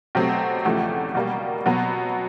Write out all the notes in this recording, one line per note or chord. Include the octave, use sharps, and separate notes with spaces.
B2 F#3 A3 C4 G4
E2 C#3 F3 A3 G4
B2 G3 A#3
B2 F#3 B3